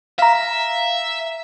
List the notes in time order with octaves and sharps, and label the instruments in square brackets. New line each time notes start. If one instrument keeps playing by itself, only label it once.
[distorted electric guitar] E5 [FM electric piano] F5 A#5